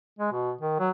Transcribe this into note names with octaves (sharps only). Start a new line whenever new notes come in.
G#3
B2
D#3
F#3